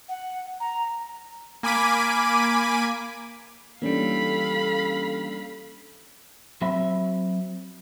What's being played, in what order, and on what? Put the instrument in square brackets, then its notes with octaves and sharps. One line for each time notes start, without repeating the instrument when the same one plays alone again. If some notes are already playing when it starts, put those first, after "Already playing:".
[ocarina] F#5
A#5
[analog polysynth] A#3 G#5 B5 D6 B6 D#7
[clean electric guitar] E3 G3 [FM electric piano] A#3 C#4 D4 [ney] A4 [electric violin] F5 B5
[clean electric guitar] F#3 C4 E5 B5